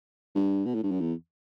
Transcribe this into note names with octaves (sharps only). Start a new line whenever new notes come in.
G2
B2
A2
G2
F#2
E2